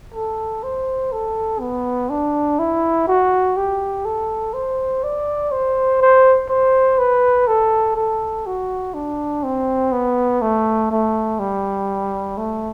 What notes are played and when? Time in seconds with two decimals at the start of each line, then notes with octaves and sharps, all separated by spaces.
0.14 A4
0.63 C5
1.12 A4
1.60 B3
2.10 D4
2.59 E4
3.08 F#4
3.57 G4
4.05 A4
4.54 C5
5.04 D5
5.52 C5
6.02 C5
6.49 C5
6.99 B4
7.48 A4
7.96 A4
8.46 F#4
8.94 D4
9.44 C4
9.92 B3
10.42 A3
10.91 A3
11.40 G3
12.38 A3